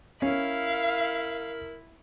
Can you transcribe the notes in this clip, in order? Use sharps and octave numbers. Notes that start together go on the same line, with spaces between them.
C#4 E4 A#4 F5 B5